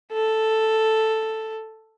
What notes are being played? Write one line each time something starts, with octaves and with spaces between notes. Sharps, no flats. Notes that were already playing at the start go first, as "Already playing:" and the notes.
A4